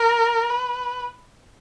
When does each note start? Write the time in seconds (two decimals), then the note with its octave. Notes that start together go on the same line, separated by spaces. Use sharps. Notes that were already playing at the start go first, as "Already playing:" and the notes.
Already playing: A#4
0.50 B4